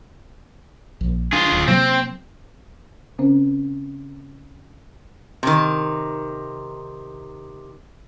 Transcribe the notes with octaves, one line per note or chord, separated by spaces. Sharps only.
A#1
D4 F4 G#4
D1
C3 F#3 A#3 C4
C#3 C4 C#4 C5
C3 D#3